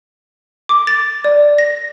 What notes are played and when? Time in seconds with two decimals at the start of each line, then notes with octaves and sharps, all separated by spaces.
0.69 D6
0.87 A6
1.24 D5
1.58 A#6